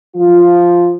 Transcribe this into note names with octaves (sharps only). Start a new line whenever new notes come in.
F3 F4